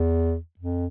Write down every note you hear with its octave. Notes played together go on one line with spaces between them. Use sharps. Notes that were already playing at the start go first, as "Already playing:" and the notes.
Already playing: E2
F2